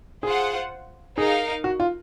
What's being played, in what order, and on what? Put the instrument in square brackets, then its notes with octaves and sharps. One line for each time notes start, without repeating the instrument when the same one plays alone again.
[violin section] F4 C5 F#5 [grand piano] G#4
[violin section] D#4 A#4 F5 [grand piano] G#4
[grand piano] F#4
F4